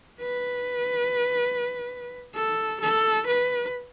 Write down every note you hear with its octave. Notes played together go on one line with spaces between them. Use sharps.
B4
A4
A4
B4